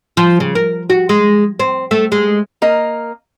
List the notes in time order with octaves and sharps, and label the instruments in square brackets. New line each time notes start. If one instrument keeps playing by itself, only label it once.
[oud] F3
C#3
A#4
F#4
G#3
C4
A3
G#3
[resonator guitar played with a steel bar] A#3 A#4 D#5